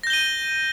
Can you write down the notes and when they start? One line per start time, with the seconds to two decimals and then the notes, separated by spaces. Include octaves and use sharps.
0.03 A#6
0.07 G6
0.10 G7
0.13 D#7